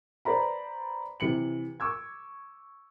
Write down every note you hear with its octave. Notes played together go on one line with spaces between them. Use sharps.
B4 C5 D5 A#5 B5
C3 E3 C#7 F#7
C#6 D6 E6 G#6